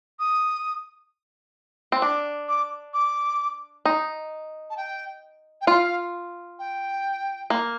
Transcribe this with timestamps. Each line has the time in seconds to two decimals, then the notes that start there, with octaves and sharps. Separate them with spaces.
0.20 D#6
1.92 C4
2.02 D4 D6
2.48 D6
2.94 D6
3.85 D#4
4.70 A5
4.77 G5
5.61 G5
5.67 F4 F5
6.59 G5
7.50 A#3